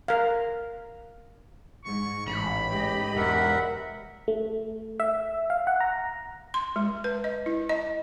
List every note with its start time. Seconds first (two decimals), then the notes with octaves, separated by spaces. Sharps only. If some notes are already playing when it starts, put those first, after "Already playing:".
0.08 A#4 F5
1.85 G#2 C#6
2.26 A1 B5
2.69 G#2 G4 D#5
3.16 E1 A#4 E5 F#5
4.28 A3
5.00 E5
5.50 F5
5.67 F#5
5.80 A#5
6.54 C6
6.76 G#3
7.04 B4
7.24 D#5
7.46 E4
7.69 D#5